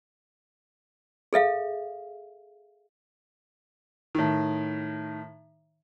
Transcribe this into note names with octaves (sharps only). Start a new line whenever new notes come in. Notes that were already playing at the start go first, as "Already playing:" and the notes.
G#4 A4 E5 F5
A2 D#3